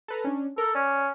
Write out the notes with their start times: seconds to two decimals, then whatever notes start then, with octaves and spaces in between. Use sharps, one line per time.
0.08 A4 B4 A#5
0.24 C#4 D4
0.58 A4 A#4
0.75 C#4 D5